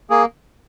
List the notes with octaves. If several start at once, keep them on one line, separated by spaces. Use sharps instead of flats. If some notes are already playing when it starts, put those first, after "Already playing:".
A#3 G#4